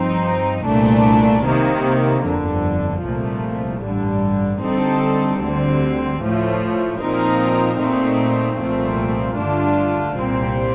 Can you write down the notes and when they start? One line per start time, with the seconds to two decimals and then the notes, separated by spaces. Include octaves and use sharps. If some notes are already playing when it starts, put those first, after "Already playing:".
Already playing: G2 F3 C4 D#4
0.65 C2 A#2 A3 D4
1.45 C3 D#3 A#3
2.23 G1 F2 D3
3.02 C2 A#2 F3 A3
3.82 A1 G2 D3 G3
4.62 D3 G3 C4 D#4 A4
5.41 D2 D3 G3 C4
6.20 A2 F3 A3
6.99 A#2 F3 C4 D#4 A#4
7.79 A#2 A3 C4 D#4
8.58 C2 A#2 F3 A3 C4
9.37 G2 D3 A3 D4 F4
10.17 C2 A#2 G3 C4